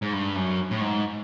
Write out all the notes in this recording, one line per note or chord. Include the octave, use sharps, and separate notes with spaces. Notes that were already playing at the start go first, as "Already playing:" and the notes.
G#2
G2
F#2
A2
G#2